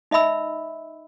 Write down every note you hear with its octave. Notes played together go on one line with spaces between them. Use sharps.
D#4 D#5 E5 B5 E6